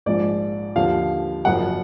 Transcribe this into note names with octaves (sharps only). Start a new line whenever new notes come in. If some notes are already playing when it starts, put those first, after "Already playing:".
A#1 G#2 F3 D5
D#2 D3 F3 F5
F#1 F#2 F3 F#5